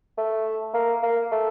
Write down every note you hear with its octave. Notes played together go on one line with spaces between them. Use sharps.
A3
A#3
A#3
A3